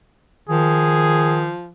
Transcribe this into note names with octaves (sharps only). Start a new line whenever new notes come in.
D#3 F3 G#4